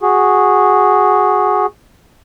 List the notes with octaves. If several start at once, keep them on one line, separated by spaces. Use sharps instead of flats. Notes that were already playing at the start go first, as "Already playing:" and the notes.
F#4 G#4